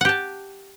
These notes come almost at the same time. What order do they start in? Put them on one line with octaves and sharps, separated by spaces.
F#5 G4 A5